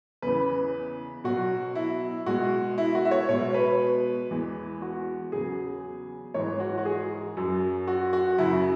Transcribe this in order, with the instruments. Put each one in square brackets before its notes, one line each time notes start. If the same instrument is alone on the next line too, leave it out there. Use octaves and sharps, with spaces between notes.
[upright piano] E2 C#3 E3 B4
B2 F#3 F#4
E4
B2 G#3 F#4
E4
F#4
E5
C#5
B2 G#3 C#5
B4
E2 E3 G#3
F#4
E2 C#3 F#3 G#4
G#2 E3 G#3 C#5
F#4
F#4
G#4
F#2 F#3
F#4
F#4
F#2 C#3 F#3 E4